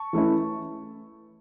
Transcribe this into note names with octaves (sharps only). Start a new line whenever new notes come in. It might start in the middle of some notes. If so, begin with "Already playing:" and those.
Already playing: A5 C#6
E3 A3 C#4 E4